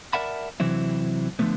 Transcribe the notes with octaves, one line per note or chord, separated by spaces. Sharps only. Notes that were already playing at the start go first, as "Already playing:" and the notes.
A#4 D5 E5 F#5 A5 B5
C3 E3 F#3 C4 E4
D3 F3 F#3 A3 B3